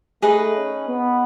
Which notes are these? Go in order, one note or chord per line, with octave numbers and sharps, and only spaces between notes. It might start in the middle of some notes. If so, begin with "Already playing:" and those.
A3 D#4 G#4 B4 D#5
C#4
B3